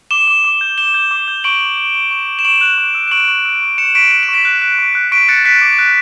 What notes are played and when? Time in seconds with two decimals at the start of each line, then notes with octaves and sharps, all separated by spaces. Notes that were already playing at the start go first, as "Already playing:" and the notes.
0.11 D6 E7 G7
0.27 D6
0.44 D6
0.61 G6
0.78 G6 E7 G7
0.94 G6
1.11 D6
1.28 G6
1.44 C#6 D7 F#7
1.61 C#6
1.78 C#6
1.95 C#6
2.11 C#6
2.28 C#6
2.39 E7
2.45 C#6 D7 F#7
2.61 F#6
2.78 C#6
2.95 E6
3.08 E7
3.11 C#6 D7 F#7
3.28 C#6
3.45 E6
3.62 C#6
3.78 C#6 C#7 E7
3.95 C#6 B6 D7
4.11 F#6 D7
4.23 E7
4.29 C#6
4.34 B6 D7
4.45 F#6
4.62 F#6
4.79 C#6
4.95 F#6
5.12 C#6 B6 D7
5.28 F#6 A6 C#7
5.45 F#6 B6
5.62 D6
5.79 F#6